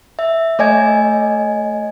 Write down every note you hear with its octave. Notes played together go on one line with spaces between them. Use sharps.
E5
A3 C#5 D#5 G#5 G#6